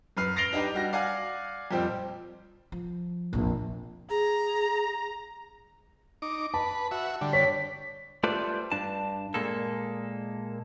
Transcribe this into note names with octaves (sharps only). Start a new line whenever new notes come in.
F#2 B4 F6 C7
A6 A#6 C7 D7 F7 G7
D4 D#4 G4 B4
G3 F#4 A#6
D5 F5 F#5 G#5
F2 A#2 G3 C4 G5
F3
A#1 F2
G#4 A#5
D#4 D6
B4 A5
F#4 E5
D3 G3
C#5 B6
G3 A3 F4 B4 C5 D5
G2 D4 A5
A#2 G#3 A#3 A4